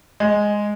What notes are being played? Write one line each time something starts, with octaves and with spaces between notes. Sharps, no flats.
G#3